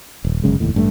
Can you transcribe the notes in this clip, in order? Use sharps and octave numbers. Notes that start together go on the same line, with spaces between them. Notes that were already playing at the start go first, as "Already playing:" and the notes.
D#1
G1 F#2 C#3 G#3
F1 D#2 A2
A1 G2 A3